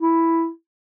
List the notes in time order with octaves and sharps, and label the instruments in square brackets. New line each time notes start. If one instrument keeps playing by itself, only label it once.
[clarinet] E4